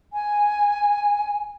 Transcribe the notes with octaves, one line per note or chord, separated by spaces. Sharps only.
G#5